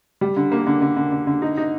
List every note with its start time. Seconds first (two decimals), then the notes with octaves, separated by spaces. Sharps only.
0.21 G3
0.37 D3
0.52 A#3
0.67 D3
0.82 D3
0.97 D3
1.12 D3
1.27 D3
1.42 D#4
1.57 D#4